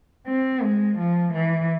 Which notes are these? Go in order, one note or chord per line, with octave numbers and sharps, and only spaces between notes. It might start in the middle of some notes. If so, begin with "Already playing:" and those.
C4
G#3
F3
E3